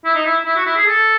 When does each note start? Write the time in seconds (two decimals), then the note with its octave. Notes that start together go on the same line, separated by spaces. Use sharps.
0.05 E4
0.15 D#4
0.25 E4
0.46 E4
0.57 F#4
0.66 E4
0.77 G#4
0.87 A4